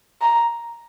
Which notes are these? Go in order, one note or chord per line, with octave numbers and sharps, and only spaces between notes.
A#5